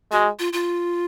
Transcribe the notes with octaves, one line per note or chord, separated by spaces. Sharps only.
G#3 F#4
F4
F4